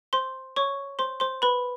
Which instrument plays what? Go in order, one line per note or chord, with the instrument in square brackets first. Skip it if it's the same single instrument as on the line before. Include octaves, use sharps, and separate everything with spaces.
[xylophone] C5 C6
C#5 C#6
C5 C6
C5 C6
B4 B5